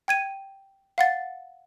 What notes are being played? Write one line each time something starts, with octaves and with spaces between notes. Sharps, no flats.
G5 G#6 D#7
F5 F#5 A6